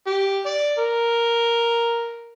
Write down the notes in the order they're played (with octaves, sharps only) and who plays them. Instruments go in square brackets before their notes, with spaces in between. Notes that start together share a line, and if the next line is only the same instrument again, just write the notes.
[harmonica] G4
D5
A#4